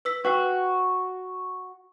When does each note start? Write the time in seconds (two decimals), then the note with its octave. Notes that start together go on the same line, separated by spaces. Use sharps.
0.05 B4 E6 B6
0.25 F#4 B4 F#5 G5